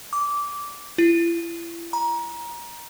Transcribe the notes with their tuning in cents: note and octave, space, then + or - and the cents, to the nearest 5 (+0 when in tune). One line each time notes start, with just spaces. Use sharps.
D6 -15
E4 +40
A#5 +25